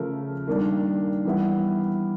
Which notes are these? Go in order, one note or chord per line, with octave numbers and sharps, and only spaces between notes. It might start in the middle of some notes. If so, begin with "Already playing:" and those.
Already playing: C#3 F3 A3 A#4
D#3 G3 A#3 D4
E3 G3 B3 E4